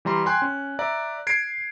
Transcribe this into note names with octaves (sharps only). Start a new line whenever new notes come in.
E3 G3 A#5 C6
G5 G#5 C6 F#6
C#4
D5 E5 A#5
G#6 C7 D7